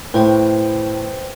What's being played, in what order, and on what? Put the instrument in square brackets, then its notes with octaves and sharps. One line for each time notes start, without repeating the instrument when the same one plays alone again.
[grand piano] A2 [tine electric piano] B4 C5 G5